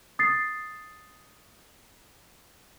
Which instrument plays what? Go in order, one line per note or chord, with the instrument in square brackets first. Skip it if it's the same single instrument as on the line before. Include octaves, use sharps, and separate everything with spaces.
[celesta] D#6 A6 C7